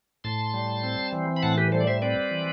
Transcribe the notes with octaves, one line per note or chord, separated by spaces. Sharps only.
A2 A5 C6
G3
C4
E3
B5
A2 F#5 A5
G4 B4
G3 A4 C5
D5
C5 E5
C4 B4 D5
E3